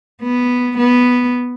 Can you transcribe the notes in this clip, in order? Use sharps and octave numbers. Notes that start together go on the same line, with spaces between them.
B3
B3